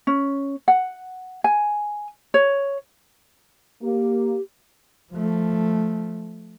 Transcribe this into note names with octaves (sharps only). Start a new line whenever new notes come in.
C#4
F#5
G#5
C#5
A#3 G4
F3 A3